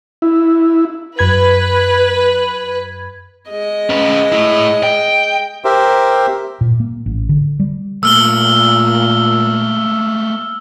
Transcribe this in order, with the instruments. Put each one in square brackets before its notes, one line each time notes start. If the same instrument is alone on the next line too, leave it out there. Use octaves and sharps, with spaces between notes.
[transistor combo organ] E4
[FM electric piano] F#2 B5 G#6 [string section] B4
[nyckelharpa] G#3 D#5
[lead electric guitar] C#4 B4
A3 E4
G5
[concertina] G4 A#4 C5 E5
[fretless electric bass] A#2
A#3
A1
D3
G3
[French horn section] A#2 [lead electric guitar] A3 A#3 [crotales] E6 F6 G7